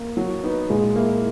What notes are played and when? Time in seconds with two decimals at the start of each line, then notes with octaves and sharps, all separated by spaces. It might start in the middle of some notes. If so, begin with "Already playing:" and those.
Already playing: A#3
0.17 F#3
0.44 B3 D#4
0.70 A#2 G#3
0.96 A#3 E4